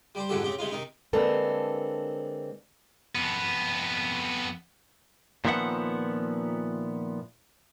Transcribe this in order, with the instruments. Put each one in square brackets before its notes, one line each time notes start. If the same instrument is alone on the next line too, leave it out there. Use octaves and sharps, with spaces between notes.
[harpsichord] G3 G4 C5
F2 G#2 D3 F#4 G4 A4
C#3 C4 G4
C3 G#3 D#4 F4
C3 D#3 D#4
[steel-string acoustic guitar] D3 G#3 A#3 C4 A4 B4
[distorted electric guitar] F2 B3
[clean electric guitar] A#2 D#3 F3 B3 E5 F#5